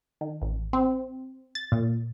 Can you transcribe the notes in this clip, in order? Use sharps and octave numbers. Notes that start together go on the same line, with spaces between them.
D#3
A1
C4
A6
A#2